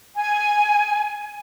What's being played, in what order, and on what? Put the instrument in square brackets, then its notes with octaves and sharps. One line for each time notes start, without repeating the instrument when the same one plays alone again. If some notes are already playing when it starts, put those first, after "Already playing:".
[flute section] G#5